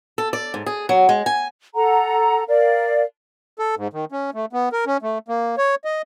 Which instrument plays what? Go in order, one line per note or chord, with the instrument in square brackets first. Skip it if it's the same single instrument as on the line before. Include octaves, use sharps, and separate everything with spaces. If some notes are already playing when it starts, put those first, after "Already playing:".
[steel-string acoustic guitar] A4
D5
G#2
G#4
F#3
G#3
G#5
[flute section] A4 F#5 A#5
A#4 D5 F5
[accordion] A4
G#2
D#3
C#4
A3
B3
A#4
C#4
A3
A#3
C#5
D#5